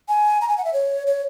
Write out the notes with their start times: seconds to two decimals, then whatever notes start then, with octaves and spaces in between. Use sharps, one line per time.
0.08 G#5
0.41 A#5
0.48 G#5
0.58 F#5
0.65 E5
0.73 C#5
1.07 C#5